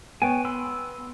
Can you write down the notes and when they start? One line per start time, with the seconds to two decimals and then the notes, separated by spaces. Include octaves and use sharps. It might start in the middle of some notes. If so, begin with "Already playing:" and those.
0.22 B3 C#5 G5 G#5
0.45 B5 C6 E6